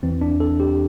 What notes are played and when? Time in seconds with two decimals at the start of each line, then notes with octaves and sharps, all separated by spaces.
0.03 E2 E3 C4
0.21 D4
0.40 A4
0.60 G4